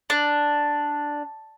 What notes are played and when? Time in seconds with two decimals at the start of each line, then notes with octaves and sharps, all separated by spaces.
0.10 D4